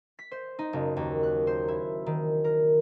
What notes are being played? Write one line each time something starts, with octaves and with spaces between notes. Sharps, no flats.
B6
C5
D#4
F#1
D#2
F#6
C5
E4
D#3
A#4